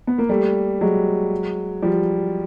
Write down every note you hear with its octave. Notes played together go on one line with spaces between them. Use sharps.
B3
A#3
G3 A3
F#3 G#3
F3 G3